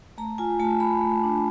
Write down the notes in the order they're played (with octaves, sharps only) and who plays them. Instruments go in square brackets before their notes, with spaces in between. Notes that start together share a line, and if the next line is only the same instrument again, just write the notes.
[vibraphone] A3 A#5
F4 G#5
A3 A5
A3 B5
A3
D4